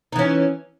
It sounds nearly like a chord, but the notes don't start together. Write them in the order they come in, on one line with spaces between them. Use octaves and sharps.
D#4 E3 C#4